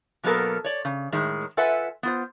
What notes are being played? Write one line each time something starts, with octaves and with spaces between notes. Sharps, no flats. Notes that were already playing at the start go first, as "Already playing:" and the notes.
B2 F#3 A#3 B3 A4 A#4
C#5 D5
C#3
A2 D#3 G#3
F4 A4 B4 E5 F#5 G#5
B3 F4 C5